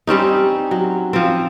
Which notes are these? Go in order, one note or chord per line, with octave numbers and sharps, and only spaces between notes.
G3 C4 C#4 D#4
F#3
F3 C4